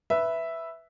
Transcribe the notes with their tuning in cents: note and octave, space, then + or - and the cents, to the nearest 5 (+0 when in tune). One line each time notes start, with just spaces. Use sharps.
B4 +0 E5 +0